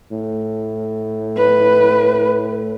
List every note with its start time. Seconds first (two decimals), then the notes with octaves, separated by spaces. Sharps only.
0.12 A2
1.38 B4